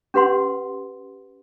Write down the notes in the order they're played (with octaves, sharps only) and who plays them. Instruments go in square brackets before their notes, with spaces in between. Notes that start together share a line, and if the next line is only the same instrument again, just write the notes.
[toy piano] C#4 G4 B4 F#5 C6